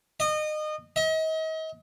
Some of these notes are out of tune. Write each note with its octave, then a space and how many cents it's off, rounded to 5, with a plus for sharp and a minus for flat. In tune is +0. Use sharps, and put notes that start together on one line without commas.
D#5 -25
D#5 +40